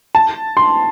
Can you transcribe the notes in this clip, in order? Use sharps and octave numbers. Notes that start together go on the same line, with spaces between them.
A5
C6